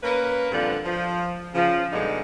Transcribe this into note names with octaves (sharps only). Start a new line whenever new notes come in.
A#3 C#4 A#4 B4
G2 A#2 D3 F3 C4
F3
C#3 F3
G2 B2 D3 G#3 D#4